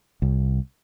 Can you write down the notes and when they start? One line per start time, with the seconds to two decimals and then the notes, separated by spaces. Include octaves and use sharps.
0.22 C2